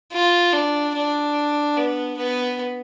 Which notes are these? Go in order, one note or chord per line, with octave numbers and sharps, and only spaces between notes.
F4
D4
D4
B3
B3